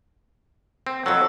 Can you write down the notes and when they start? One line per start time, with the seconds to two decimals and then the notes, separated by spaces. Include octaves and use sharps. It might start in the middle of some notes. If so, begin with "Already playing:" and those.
0.87 C4
1.06 F2 F#3 A4